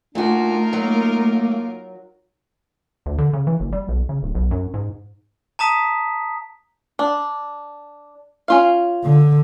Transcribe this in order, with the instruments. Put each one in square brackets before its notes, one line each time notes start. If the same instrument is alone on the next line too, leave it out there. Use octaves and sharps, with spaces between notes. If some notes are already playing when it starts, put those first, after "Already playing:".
[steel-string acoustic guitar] A#2 F#4 [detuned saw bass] A3 [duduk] D4 [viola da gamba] D#4 F4 A#4
[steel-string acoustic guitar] F#3 [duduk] A#3
[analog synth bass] D2
D3
C#3
E3
F#1
G3
B1
C#3
D1
B1
F#2
G#2
[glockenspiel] A5 A#5 D#6 B6
[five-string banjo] D4
C#4 F4 F5
[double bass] D3